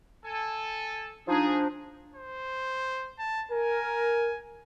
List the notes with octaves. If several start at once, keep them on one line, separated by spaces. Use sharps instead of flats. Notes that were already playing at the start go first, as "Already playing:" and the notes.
A4 G#5
F3 D4 D#4 G#4
C5
A5
A#4 G#5